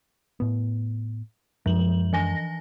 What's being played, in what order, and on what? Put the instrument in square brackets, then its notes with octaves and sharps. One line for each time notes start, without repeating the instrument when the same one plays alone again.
[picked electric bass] A2 B3
[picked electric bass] F#2 G#3 [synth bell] F3 F#7
[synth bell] E3 G#5 A#6